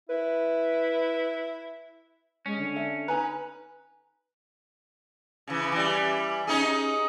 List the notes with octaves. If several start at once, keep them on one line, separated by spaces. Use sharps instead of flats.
E4 B4
G#3 C#4
D3
D4 E5
D#4 B4 G#5 A#5
C#3 E3
E3 G3
C#4 D#4 G#4